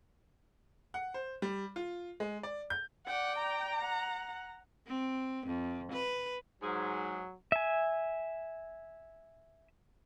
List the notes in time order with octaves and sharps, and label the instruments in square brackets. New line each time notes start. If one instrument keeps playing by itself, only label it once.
[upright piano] F#5
C5
G3
F4
G#3
D5
G6
[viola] D5 G5 [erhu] F#5
[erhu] A#5
[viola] F#5
[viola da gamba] C4
F2
B4
[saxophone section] G#2 G#4 [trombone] F#3
[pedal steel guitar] E5 G#5